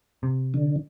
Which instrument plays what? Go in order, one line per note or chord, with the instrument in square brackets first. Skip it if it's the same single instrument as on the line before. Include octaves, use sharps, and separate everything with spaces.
[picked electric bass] C3
[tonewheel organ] D3